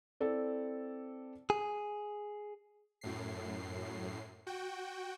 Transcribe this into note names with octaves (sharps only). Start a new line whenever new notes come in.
C4 E4 A4 D5
G#4
F#2 A2 C7
F#4 G5